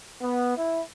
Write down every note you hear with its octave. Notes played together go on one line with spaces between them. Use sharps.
B3
E4